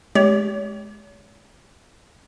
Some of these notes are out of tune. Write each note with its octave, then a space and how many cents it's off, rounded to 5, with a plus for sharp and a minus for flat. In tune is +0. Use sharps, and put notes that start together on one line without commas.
G#3 +25 G4 +0 C#5 +40